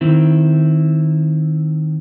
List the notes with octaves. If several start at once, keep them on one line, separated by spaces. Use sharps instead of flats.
D#3 C4 E4